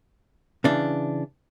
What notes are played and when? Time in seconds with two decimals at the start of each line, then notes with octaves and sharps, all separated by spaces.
0.64 C#3 E3 D4